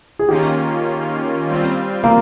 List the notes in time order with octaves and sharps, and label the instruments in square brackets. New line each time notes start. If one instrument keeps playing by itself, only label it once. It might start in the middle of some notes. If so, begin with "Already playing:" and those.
[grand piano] G#4
[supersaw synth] D#3 A#3 C#4 F4 [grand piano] G4
[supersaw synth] G3 C4 F4
[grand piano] A#3